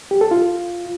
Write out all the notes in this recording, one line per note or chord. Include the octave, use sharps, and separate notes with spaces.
G4
A4
F4